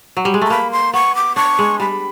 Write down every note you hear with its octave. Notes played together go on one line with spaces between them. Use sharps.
F#3
G3
G#3
A3 A#5
A#3 B5
C6
B3 C#6
D6
D4 C#6
G#3
G3 B5